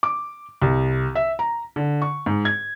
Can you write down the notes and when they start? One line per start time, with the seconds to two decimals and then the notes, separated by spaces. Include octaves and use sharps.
0.03 D6
0.62 C2
1.15 E5
1.39 A#5
1.76 D3
2.02 C#6
2.26 G#2
2.45 G#6